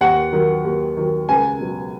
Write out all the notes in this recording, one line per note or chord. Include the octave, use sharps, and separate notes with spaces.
D#2 F#5
D#3 F#3
D#2
D#3 F#3
C#2 G#5
B2 F#3